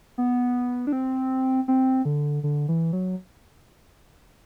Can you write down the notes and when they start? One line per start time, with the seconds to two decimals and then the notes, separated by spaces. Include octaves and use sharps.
0.18 B3
0.87 D4
0.93 C4
1.68 C4
2.05 D3
2.44 D3
2.69 E3
2.93 F#3